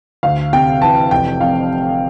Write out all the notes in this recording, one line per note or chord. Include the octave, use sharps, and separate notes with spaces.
D2 F5
C3 G5
E3 A5
F1 G5
F2 F5